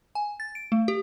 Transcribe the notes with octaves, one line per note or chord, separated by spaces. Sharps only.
G#5
A6
D7
A3
G4